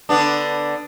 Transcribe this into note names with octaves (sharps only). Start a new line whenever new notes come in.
D3 B3 D4